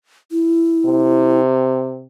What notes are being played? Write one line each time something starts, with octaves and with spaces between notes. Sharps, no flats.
E4
C3